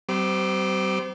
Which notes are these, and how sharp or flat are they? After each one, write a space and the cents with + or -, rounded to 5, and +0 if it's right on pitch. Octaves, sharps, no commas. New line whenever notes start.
G3 -40 C4 -20 D6 +15